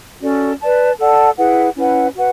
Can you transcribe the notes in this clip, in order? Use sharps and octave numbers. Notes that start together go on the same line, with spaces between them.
C#4 F#4 A4 D5
B4 D5 A5
A4 D5 F#5 A5
E4 G#4 B4 F#5
C#4 E4 B4 F#5
F#4 B4 F#5